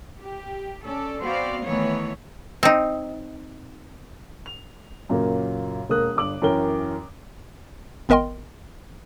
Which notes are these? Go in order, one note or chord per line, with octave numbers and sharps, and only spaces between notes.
G4
C#4 A4 D5
B3 C4 F#4 C5 D5 F5
D#3 E3 A3 B3 C#5
C4 D#4
F7
F#2 A#2 C#3 F#3 A#3
E1 A#3 A#4 D#6 F#6
G1 G2 D6 F#7
F#2 E3 C#4 A#4 G5 G7
G#1 B3 A#4 D#5 G5 C6